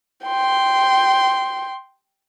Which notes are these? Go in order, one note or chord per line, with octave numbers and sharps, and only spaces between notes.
G5 C6